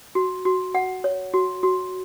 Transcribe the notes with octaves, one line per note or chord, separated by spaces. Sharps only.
F#4
F#4
F#5
C#5
F#4
F#4